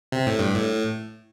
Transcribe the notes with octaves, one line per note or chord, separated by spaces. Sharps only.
C3
A2
G2
A2